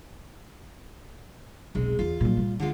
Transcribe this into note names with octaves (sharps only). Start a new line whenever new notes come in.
E1 B1 C3 G#3
E2 D3 F4
A#2 F#3
A#2 G3
D2 D3 G#3 F4